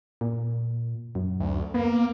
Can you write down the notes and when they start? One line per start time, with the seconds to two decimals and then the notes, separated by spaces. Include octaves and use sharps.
0.21 A#2
1.15 F#2
1.40 D2
1.74 A#3 B3